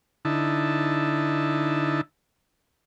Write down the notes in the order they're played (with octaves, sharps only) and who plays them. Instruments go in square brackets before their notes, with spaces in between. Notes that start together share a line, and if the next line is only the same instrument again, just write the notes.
[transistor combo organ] D3 D#4 E4 A5